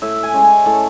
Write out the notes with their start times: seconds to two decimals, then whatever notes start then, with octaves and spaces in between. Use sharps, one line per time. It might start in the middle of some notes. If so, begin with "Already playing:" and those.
0.02 A2 E5
0.23 G#5
0.33 G#3 C#4
0.44 G#5
0.66 A2 A5